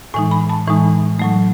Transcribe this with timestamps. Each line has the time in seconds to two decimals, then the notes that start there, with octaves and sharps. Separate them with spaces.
0.14 A2 E3 G#3 D#4 G#5
0.31 B5
0.50 A5
0.67 A2 E3 G#3 D#4
1.19 A2 F#3 A3